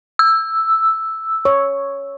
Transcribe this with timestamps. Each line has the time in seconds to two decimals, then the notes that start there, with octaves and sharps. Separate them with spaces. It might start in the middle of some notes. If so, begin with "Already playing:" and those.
0.19 E6
1.45 C#5